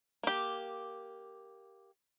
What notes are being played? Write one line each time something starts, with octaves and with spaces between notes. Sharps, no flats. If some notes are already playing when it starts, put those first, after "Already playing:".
A#3 G4